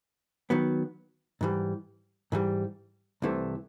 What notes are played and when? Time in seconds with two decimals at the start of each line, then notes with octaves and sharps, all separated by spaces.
0.50 D#3 F#3 B3
1.41 G#2 E3 G3
2.32 G#2 E3 G3
3.22 C2 C3 E3 A3